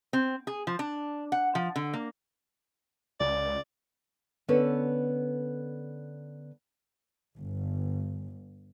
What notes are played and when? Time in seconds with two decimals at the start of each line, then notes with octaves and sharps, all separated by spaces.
0.13 C4
0.47 G#4
0.67 F3
0.79 D4
1.32 F#5
1.55 F3
1.76 D3
1.94 A#3
3.20 C#2 D5
4.48 D3 B3 C#4 A4 B4
7.39 G1